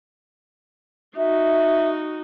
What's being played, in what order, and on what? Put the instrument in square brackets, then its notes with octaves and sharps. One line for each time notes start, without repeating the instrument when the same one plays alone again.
[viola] D#4 F#4 [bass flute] E5